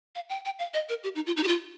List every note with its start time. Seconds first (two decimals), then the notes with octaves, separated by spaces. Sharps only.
0.15 F5
0.29 G5
0.45 G5
0.59 F5
0.74 D#5
0.89 A#4
1.04 G4
1.15 D#4
1.27 F4
1.37 D#4
1.43 G4
1.48 F4